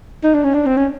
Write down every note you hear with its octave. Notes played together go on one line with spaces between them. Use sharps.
D#4
D4
C#4
D4
C4
C#4